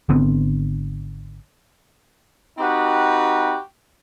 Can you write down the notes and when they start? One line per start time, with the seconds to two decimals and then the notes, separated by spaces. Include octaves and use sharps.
0.09 G#1 D3 B3 C4
2.58 C4 D#4 F#4 G4 B4